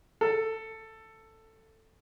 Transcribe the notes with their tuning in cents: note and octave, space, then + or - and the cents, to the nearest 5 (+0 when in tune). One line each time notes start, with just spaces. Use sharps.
A4 +10